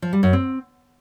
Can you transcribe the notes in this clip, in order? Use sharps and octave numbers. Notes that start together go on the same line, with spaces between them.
F3
G3
F#2
C4